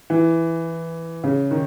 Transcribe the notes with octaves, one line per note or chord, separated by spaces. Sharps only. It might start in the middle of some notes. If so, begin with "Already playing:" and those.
E3
C#3
D#3